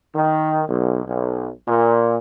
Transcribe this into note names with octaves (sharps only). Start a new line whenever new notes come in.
D#3
B1
B1
A#2